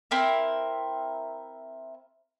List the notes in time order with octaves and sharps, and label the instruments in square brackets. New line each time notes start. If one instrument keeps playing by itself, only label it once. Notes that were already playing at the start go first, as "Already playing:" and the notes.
[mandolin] C4 E4 A#4